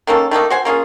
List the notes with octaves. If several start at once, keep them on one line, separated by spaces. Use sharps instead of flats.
D#3 A#3 C#4 A4
D#3 A3 A#3 D#4
F#4 C5 G#5
A#3 C#4 F4 G#4